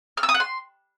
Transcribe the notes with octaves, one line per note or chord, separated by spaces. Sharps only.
F6
E6
D#6
F#5
C6